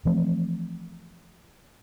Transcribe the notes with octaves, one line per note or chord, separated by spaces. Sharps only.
E3 F3 A3 C4